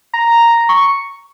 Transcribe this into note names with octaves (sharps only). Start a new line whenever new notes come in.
A#5
C#6